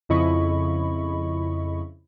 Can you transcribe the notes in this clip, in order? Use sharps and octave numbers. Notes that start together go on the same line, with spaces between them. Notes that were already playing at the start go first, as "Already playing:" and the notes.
F2 C#3 E4 D#5 B5 C#6